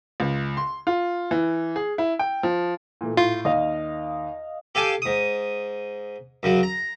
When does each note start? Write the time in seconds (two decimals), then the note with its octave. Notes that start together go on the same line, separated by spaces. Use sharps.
0.20 C#2
0.57 C6
0.87 F4
1.31 E3
1.76 G#4
1.98 E4
2.19 G5
2.43 F3
3.01 A#2 E3 A3
3.17 A2 F4
3.45 D#2 D#5 F5
4.75 G4 A4 F5 G#5 A5
5.02 G#2 D#6
6.43 F#2 C#3 F#3
6.63 A#5